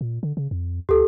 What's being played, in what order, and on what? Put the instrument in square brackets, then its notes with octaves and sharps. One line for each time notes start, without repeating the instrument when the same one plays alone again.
[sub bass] A#2
D3
C#3
F2
[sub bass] D2 [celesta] G4 A4